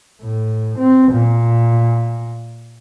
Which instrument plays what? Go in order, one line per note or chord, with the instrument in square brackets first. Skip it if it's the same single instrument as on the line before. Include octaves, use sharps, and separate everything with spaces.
[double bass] A2
C4
A#2